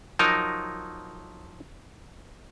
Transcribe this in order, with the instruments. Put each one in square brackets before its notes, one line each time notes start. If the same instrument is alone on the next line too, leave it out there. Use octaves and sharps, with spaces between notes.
[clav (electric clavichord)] F3 F#3 D#4 A#4